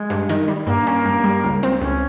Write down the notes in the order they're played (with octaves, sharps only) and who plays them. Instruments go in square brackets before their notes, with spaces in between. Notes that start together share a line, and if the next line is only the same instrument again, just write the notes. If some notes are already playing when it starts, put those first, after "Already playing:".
Already playing: [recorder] G#3
[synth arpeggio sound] G2
D#3
G3
[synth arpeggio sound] G2 [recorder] A#3
[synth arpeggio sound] C#4
G2
G3
C#2
C4
[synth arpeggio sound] C#2 [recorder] C#4